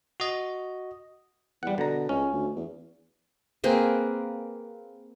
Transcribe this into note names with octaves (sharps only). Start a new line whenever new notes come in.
F#4 D#5
E2 G3 F#5
B2 D3 A#5
C#2 C#4
D2
E2
A#3 C4 G#4 B4